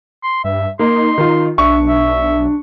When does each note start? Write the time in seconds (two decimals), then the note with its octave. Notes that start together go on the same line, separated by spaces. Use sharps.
0.23 C6
0.44 G2 E5
0.79 A#3 D#4 C6
1.18 D#3 F4
1.58 B1 D4 E5 C#6
1.88 E5